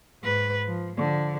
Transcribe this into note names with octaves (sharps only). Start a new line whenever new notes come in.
G#2 B4
F3
D3 F3